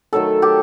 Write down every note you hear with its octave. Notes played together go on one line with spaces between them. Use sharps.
D#3 F#3 A3 A4
G4